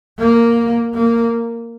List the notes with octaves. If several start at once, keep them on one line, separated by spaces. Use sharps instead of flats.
A#3
A#3